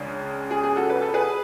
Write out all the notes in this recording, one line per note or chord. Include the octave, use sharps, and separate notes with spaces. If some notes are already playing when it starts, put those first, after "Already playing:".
Already playing: C#2 C#3 G#3 D4
G#4
G#4
F#4 A4
B4
A4
G#4 B4